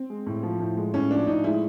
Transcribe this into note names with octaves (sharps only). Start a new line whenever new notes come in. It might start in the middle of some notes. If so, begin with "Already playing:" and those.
Already playing: C4
G#3
A2
F3
A2
G#3
A2 C#4
F3 D4
A2 D#4
G#3 E4